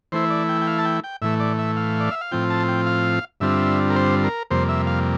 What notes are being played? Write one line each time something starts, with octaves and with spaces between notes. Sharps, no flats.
E3 A3 E4 C5
D5
G5
G5
F5
A5
G5
G5
A2 E3 A3 E5
D5
E5
F5
D5
E5
F5
A2 F3 C4 F4 G5
A5
G5
F5
G2 D3 G3 C4 F4 E5
A#4
C5
A#4
F2 C3 G3 A#3 C5
E5
F5